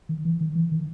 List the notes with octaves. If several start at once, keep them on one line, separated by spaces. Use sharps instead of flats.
D#3
E3
D#3
E3
D#3